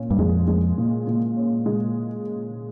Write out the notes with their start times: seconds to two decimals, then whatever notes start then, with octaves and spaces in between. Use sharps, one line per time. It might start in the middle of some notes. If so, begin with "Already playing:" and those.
Already playing: A#2 C#4
0.11 G2
0.18 F2 G#3
0.48 G#3
0.78 A#2
1.07 A#2
1.37 C#4
1.66 G#3